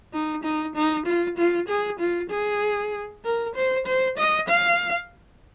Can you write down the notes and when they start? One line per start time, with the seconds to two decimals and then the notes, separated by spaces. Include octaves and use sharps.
0.13 D#4
0.44 D#4
0.76 D#4
1.06 F4
1.38 F4
1.69 G#4
1.99 F4
2.31 G#4
3.25 A#4
3.55 C5
3.86 C5
4.18 D#5
4.49 F5